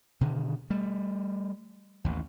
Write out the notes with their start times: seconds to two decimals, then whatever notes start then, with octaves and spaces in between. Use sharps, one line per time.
0.21 B2 D3 D#3
0.70 G3 A3
2.04 A1 D#2